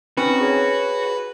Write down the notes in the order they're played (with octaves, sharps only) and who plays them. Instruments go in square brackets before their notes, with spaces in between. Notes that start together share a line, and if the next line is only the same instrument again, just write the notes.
[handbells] C4 C#4 D#4 [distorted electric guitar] F#4 [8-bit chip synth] B4
[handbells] G#4 C#5